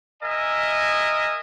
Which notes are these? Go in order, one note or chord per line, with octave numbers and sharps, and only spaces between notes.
A#4 D#5 E5 G#5